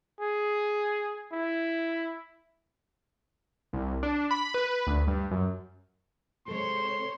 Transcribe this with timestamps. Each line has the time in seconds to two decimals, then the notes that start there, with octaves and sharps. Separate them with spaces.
0.21 G#4
1.32 E4
3.73 C2
4.03 D4
4.31 B5
4.54 B4
4.87 D2
5.07 G2
5.31 F#2
6.48 C3 G#3 A4 C5 C#5 C6